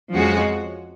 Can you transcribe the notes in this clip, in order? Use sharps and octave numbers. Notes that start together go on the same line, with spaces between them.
F2 F3 G#3 C#4 F#4